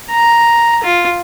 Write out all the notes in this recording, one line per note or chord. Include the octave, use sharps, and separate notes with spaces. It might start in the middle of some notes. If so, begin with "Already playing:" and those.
A#5
F4